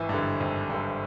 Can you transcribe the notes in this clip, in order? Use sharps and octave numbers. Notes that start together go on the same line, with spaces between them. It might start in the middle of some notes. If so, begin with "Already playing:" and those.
Already playing: G#1 E3 E4
G2
D3
G#1
G2 D3